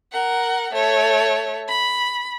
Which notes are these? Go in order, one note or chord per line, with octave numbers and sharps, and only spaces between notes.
A#4 F#5
A3 C#5
B5